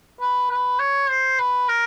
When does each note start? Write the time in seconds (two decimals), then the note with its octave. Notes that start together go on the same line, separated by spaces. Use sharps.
0.21 B4
0.50 B4
0.79 C#5
1.09 C5
1.39 B4
1.69 A#4